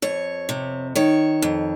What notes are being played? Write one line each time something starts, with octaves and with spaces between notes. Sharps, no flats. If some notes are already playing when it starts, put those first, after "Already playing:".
F2 C#5
C3
D#3 C#5
F2